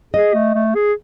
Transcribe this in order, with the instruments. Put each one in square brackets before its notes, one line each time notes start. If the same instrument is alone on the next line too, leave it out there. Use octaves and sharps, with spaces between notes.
[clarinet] G#4 [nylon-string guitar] D#5
[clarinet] A3
A3
G#4